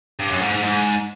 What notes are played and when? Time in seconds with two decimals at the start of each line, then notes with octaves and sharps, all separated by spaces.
0.19 G2
0.30 F#2
0.41 G#2
0.52 G#2
0.63 G#2